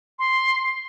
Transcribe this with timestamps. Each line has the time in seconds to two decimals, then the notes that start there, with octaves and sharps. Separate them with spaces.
0.19 C6